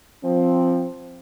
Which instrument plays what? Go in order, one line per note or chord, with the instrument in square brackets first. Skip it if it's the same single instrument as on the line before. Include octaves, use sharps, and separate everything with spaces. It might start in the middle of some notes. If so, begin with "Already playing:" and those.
[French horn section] F3 C4